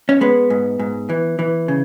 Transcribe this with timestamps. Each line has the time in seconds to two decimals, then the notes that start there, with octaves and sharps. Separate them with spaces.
0.09 C#4
0.21 G#3 B3
0.50 G#2
0.79 G#2
1.09 E3
1.39 E3
1.68 C#3